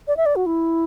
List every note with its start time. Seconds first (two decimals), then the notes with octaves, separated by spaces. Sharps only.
0.08 D5
0.17 E5
0.26 D5
0.36 F#4
0.46 E4